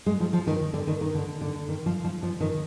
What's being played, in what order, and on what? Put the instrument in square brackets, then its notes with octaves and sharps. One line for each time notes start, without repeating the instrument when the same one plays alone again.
[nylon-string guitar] G#3
F3
F3
D#3
D3
D#3
D#3
D3
D3
D#3
F3
F3
F3
D#3